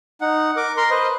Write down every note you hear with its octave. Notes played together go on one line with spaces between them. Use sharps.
D#4 F#5
A#4 D6
A#4 A#5 C6
B4 C5 D#5